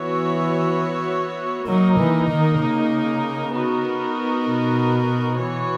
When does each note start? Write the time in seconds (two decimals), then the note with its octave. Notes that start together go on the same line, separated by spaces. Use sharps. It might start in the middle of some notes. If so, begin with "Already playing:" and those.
Already playing: E3 B3 F#4 C#5 E5
1.67 F#3 A#3 D#4 A#4
1.99 E3
2.30 D#3
2.60 C#3
3.54 B3 D#4 F#4 A#4
4.47 B2
5.40 E3 B3 F#4 C#5